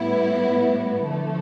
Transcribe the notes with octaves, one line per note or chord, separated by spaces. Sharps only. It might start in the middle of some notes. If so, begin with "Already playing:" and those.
Already playing: A2 G3 B3 E4
D3 F3 A3